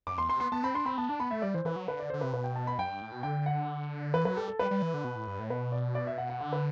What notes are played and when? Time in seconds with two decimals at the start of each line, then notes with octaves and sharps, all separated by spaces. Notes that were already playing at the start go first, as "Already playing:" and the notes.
0.07 F#2 D6
0.18 E2 C6
0.29 C3 C6
0.40 B3 C6
0.52 B3 A5
0.63 C4 B5
0.74 D4 C6
0.85 C4 B5
0.98 B3 A5
1.09 D4 A5
1.20 B3 B5
1.31 A3 E5
1.42 G3 D5
1.55 E3 C5
1.65 E3 B4
1.76 F#3
1.88 D3 B4
2.00 D5
2.10 D3 C5
2.21 C3 B4
2.33 B2 B4
2.44 G5
2.55 A5
2.67 B5
2.78 F#2 G5
2.90 G2
3.02 A2
3.12 B2
3.23 D3 G5
3.46 F#5
4.14 E3 B4
4.25 F#3 B4
4.37 G3 A4
4.48 A4
4.59 G3 B4
4.71 G3
4.82 E3
4.94 D3
5.04 B2
5.16 A2
5.27 G2
5.39 A2
5.50 B2 B4
5.72 D5
5.95 D5
6.07 E5
6.18 F#5
6.29 F#5
6.41 D3 F#5
6.53 B4